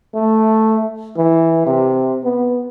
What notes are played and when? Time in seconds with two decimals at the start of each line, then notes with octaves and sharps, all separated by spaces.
0.15 A3
1.17 E3
1.67 C3
2.24 B3